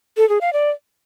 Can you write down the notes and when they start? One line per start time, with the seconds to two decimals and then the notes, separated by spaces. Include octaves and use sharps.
0.17 A4
0.29 G#4
0.41 F5
0.53 D5